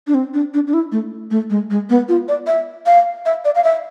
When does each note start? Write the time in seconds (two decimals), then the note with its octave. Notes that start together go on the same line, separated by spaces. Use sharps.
0.07 D4
0.14 C4
0.34 D4
0.54 D4
0.67 D4
0.74 E4
0.92 A3
1.31 A3
1.50 G#3
1.71 G#3
1.90 B3
2.09 F4
2.28 D5
2.47 E5
2.86 F5
3.26 E5
3.45 D5
3.55 F5
3.64 E5